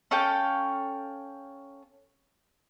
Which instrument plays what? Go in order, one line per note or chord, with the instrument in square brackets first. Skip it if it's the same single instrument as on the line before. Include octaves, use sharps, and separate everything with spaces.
[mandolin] C#4 A4 F5 G5